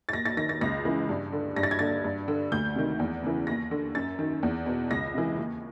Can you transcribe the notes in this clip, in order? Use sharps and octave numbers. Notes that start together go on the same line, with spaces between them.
A6
D#2 A#6
A6
D#3 A#6
A6
C#2 A#6
C#3 E3
G2
D3
G2 A#6
A6
G#6
D3 A6
G2
D3
D2 G6
C3 D#3
E2
C#3 E3
D#2 A#6
D3
F#2 A6
D#3
E2
B2
C#2 A#6
C3 E3
D#2